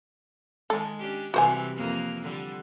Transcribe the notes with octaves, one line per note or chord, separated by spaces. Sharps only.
D#3 G#3 A4
C#4 D4 G4
C3 E3 G3 F#4 C5 G#5
F2 A#3
D3 G3